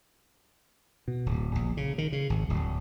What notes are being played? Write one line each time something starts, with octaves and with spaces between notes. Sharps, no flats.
B2
D1
A#1
C#3
D#3
C#3
G#1
D1